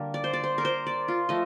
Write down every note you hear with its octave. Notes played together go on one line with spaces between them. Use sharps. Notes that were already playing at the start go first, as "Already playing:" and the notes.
Already playing: D3 G3 A#3
D5
C5
D5
C5
A#4
C5
D5
F4
F3 A3 D#5